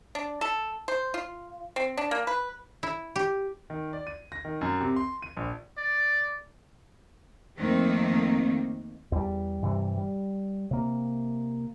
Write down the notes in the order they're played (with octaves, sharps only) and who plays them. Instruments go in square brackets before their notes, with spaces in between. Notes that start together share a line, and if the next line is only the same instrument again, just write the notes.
[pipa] D4
A4
C5
F4
C4
D4
A#3
B4
[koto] E4
G4
[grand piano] D#3
D5
D#7
A#6
D#3
F#2
C3
C6
D#7
A#1
[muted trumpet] D5
[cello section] F2 D#3 A3 A#3 C4
[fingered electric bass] E2 G3
G2 C3 E3 G3
G3
C3 A#3